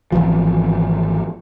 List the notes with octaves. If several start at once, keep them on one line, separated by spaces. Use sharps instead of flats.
G#1 D2 E3 F3